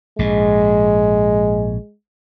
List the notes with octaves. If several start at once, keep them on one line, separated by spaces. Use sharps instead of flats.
A#1 G#2 G#3